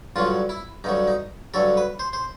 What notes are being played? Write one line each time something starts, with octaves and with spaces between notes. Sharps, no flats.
G2 D3 F#3 F4
E4
G2 D3 F#3 D#4
D#4
G2 D3 F#3 A4
B4
C5
C5